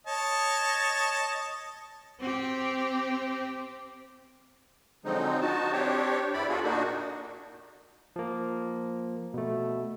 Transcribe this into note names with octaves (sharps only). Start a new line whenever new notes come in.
C#5 D#5 A5
C4 G4
D3 F3 F#3 G#3 C4 D#4
D#4 F#4 A5
C4 D4 G4 C#5
E2 D3 E4 D5 B5
B3 F4 F#4 G#4 A4
A#2 A#3 D4 D#4 F#4
F3 A#3
B2 A3